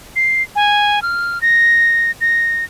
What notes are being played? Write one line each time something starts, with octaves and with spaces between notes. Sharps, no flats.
C7
G#5
F6
A#6
A#6